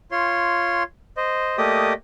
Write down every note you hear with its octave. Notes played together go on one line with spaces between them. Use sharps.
F4 C#5 C6
C5 D#5
A3 A#3 G4 D5 D#5 D#6